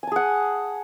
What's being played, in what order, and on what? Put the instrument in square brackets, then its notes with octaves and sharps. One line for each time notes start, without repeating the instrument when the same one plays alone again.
[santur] G#5
A5
G#4
F#5